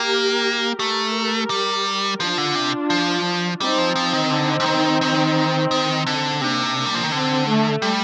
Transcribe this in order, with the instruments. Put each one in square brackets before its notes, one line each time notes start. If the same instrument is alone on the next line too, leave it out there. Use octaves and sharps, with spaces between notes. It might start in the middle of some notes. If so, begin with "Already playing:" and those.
Already playing: [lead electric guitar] A#3 [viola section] G4 A#4
[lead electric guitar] A3 [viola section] G4 A#4
[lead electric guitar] G3
[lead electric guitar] F3 [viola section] D4 F4
[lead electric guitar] D3
C3
F3
[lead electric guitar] G3 [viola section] C4 D#4
[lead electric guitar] F3
F3
D#3
D3
D3
D#3
D#3
D#3
D3
[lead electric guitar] C3 [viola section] A#3 D4
[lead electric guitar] G3
F3
D#3
[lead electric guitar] D3 [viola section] C4
[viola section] A3
[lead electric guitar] G3